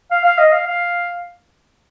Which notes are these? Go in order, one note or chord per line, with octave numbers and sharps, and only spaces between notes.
F5
F5
D#5
F5
F5